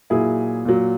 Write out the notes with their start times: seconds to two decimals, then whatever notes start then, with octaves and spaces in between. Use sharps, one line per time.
0.10 A#2 F#3 E4 G#4
0.65 A#2 F#3